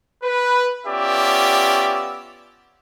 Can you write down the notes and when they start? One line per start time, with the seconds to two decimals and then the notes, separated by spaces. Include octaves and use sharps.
0.23 B4
0.86 B3 C#4 F4 G4 D5 E5